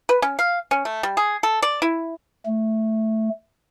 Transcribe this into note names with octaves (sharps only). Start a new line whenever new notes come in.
B4
C#4
F5
C#4
A3
G3
G#4
A4
D5
E4
A3